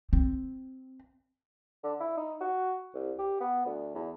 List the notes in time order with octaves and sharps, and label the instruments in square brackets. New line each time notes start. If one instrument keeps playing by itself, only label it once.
[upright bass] C4
[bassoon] D3
E4
D#4
F#4
C2
G4
B3
D2
E2